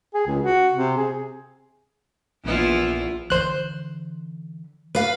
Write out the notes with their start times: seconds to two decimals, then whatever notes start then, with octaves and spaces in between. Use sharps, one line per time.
0.14 G#4
0.27 C#2
0.42 F#4
0.75 C3
0.97 G#4
2.44 A#1 E2 E4 F4
3.30 D3 E3 C5 F#6
4.95 B4 F5